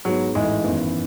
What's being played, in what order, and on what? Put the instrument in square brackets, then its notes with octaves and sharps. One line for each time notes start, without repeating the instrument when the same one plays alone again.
[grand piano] G#2 G#3 B3 [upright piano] F#3
[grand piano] A1 G#2 E3 A3 E4 [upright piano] G#3
[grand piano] G#1 F#2 E3 B3